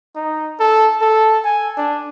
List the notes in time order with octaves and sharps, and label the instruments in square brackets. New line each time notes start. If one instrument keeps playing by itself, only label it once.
[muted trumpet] D#4
A4
A4
G#5
D4